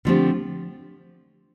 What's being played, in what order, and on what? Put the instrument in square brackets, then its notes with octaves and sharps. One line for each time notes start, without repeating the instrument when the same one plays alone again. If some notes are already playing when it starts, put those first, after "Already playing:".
[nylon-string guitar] D3 F3 A3 C4 G4